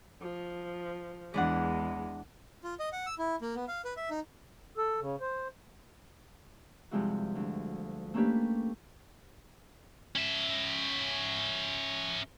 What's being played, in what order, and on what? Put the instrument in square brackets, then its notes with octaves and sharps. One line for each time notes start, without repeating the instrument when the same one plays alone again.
[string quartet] F3
[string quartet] E2 G#3 [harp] E3 D4 F#5
[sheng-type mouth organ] F4
D#5
F#5
E6
E4
A#3
B3
F5
B4
E5
D#4
[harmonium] A4
C#3
C5
[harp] G2 C3 F3 G#3 E4 F#4
D2
A3 A#3 C#4 D4 G4 B4
[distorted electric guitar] C#4 E5